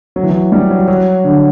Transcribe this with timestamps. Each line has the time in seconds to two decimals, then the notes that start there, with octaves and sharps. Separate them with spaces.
0.16 F#3
0.23 E3
0.30 F#3
0.52 G3
0.71 F#3
0.88 F#3
1.24 D3